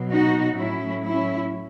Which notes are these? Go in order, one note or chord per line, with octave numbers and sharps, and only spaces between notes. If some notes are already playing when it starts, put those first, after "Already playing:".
Already playing: B2 F#3
D#4 F#4
A2 F#3 C#4 E4
C#4 E4